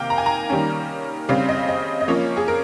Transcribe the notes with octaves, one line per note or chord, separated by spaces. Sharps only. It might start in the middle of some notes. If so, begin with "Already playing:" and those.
Already playing: C3 D#3 A#3 F5 G5
A#5
G#5
A#5
D#3 G3 A#3 C#4
C#3 G3 C4 F5
D#5
D#5
D#5
F3 A#3 C#4 C#5
G#4
A#4